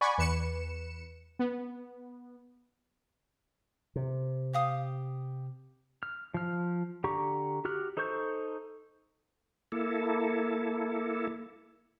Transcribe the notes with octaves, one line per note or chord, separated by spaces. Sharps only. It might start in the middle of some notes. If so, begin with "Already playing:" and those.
D5 F#5 G#5 B5 C#6
E2 B4 C#7 E7
B3
C3
G4 F5 D#6
F6
F3 F6
D3 G4 A#5 C#6
F#4 G4 F6 F#6
D#4 A4 C5 C#6 G6
A#3 E4 A4